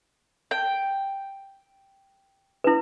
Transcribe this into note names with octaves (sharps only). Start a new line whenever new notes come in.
G5
E4 B4